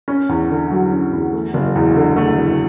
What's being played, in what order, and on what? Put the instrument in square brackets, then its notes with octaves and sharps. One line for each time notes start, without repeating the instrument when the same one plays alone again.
[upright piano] C#4
E2
D3
F#3
C#4
E2
A3
F#1
E2
D3
A3
F#1